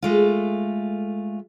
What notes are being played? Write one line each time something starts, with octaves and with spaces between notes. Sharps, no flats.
G#3 A3 F4